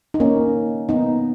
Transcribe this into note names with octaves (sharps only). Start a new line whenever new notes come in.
D#4
A#3 C#4
B3 D#4